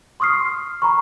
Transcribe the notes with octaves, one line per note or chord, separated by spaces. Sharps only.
C6 C#6 D#6 F6 C7
F6
A#5 B5 C#6